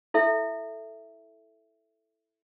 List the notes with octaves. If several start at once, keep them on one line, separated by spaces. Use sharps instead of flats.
E4 A4 E5